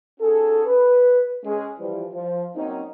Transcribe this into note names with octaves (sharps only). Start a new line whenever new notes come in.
C#4 D#4 F#4 G#4 A4
B4
G#3 C#4 G#4
E3 F3 G3
F3
F#3 A#3 C4 C#4 D#4